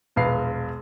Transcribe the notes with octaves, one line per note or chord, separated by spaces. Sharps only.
E1 A#1 B4 F5 C7